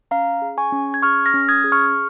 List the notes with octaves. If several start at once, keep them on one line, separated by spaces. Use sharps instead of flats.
C#4 F5 A#5
G#4
G#5 C#6
C#4
G#6
G#4 C#6 F6
F6 A#6
C#4
D#6 G#6
G#4
C#6 F6